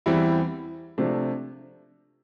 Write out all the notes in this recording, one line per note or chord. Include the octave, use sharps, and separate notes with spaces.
E2 E3 G3 C4 E4
C3 F3 A3 D4